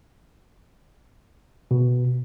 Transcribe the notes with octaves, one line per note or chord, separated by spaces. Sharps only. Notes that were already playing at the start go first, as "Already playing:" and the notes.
B2